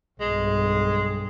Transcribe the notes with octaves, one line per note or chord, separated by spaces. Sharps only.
B1 G2 G#3